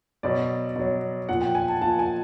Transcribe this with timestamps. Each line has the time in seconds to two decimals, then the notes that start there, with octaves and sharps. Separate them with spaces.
0.23 B2 F#3 D5
0.76 B2 F#3
1.29 A#2 F3 F#5
1.42 G5
1.55 G#5
1.68 A5
1.81 A#2 F3 A5
1.99 G#5